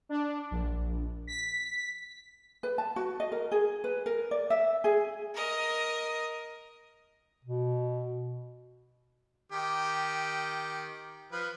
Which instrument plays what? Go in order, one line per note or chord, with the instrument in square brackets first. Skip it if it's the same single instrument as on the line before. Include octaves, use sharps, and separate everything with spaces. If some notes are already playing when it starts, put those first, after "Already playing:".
[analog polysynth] D4
A#1
B6
[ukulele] B4
A5
F#4
D#5
A#4
G#4
B4
A#4
D5
E5
G#4
[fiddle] A#4 D#5
[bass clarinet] B2
[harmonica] D#3 G4
F3 B4